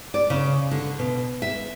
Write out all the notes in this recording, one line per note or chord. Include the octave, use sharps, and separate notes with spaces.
D5
C#3
D3
B2
E5